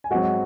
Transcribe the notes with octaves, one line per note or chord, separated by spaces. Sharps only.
G#5
G#2 F#3 C4 F#4 F#5